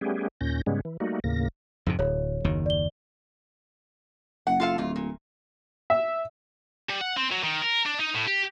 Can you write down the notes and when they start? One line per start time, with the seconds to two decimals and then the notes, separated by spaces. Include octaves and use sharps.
0.01 G3 A3 B3 C#4 G4 G#4
0.41 D#2 A#2 C#4 G6 A#6
0.66 G#2 C#3 G3 G#3 B3 C#4
0.85 E3
1.00 G3 A3 A#3 D#4 F#4
1.24 D#2 A2 C#3 A#3 A#6
1.86 F2 G#2 C3
1.99 D1 C#5
2.44 F#1 D#2 D#3
2.66 D5 G7
4.47 F#1 F#5
4.60 F4 A4 F5
4.78 D1 F2 F4
4.96 A#2
5.90 E5
6.90 G3
7.01 F#5
7.17 C4
7.32 F#3
7.44 D#3
7.62 A#4
7.86 D4
8.00 D#4
8.14 A2
8.27 G4